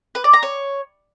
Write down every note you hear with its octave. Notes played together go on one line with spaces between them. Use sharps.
B4
D5
A#5
C#5